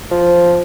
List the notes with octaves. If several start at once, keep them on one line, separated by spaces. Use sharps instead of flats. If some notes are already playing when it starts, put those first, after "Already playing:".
F3